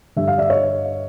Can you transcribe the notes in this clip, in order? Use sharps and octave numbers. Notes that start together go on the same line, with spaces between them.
G2 D3 G3 E5
F5
D5 E5
C#5 D#5